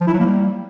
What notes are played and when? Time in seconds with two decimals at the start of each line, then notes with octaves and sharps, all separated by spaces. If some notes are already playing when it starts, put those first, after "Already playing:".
0.01 F3
0.07 E4
0.13 F#3
0.19 A#3
0.26 G3